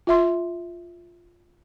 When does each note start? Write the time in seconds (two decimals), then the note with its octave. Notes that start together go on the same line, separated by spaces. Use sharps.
0.07 F4 E5 C6